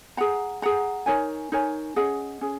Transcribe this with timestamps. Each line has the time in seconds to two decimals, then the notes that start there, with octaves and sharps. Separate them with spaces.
0.17 G#4 F#5 A#5
0.62 G#4 F#5 A#5
1.06 D#4 A#4 C#5 G#5
1.52 D#4 A#4 C#5 G#5
1.96 C#4 G#4 D#5 F#5
2.41 C#4 G#4